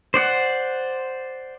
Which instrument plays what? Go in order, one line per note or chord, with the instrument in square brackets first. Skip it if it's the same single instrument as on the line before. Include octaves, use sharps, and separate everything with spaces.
[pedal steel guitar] C5 D5 F#5